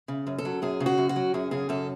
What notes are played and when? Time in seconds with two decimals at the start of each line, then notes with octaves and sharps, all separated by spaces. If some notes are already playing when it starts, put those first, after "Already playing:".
0.08 C#3
0.27 F#2
0.38 A4
0.45 F#3
0.62 F#2 G#4
0.80 C#3
0.86 F#4
0.98 F#2
1.09 F#4
1.16 F#3
1.34 F#2 G#4
1.51 C#3 G#4
1.69 F#2 A4